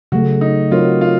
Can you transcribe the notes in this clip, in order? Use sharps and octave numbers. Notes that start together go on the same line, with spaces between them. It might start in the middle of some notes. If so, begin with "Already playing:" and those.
C#3 F#3 A3 F#4
D#4
F#3 C4 F4 F#4 A#4 C#5
F4